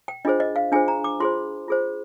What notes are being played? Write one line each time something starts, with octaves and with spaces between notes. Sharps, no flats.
G5
D4 F4 G#4 C5 D#5
D#5
F5
D4 F4 G#4 C5 G#5
A#5
D6
F4 G#4 C5 C6
F4 G#4 C5